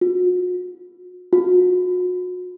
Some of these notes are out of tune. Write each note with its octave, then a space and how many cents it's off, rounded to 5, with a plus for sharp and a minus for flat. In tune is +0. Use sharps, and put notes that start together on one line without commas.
F#4 -40
F#4 -35